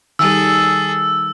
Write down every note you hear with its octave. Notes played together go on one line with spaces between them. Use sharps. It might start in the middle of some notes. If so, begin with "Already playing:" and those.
D#3 G3 G#4 A4 E6